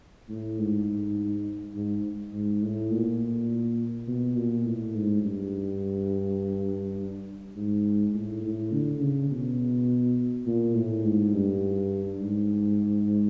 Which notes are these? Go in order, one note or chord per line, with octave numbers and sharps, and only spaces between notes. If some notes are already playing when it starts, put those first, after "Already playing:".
A2
G#2
G#2
G#2
A2
A#2
B2
A#2
A2
G#2
G2
G#2
A2
A2
D3
C#3
B2
A#2
A2
G#2
G2
G#2